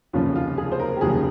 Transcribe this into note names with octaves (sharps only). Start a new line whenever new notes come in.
F1 D#2 C#3 F3 F4
F4
G#4
C5
A#4
G4
F1 D#2 C#3 F3 G#4